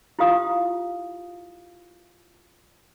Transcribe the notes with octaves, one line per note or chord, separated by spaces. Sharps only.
E4 F4 G4 F5 D#6